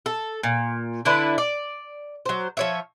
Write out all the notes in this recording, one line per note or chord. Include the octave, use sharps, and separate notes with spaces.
A4
A#2
D3 D4 E4 B4
D5
F#3 C5
F3 C#5 E5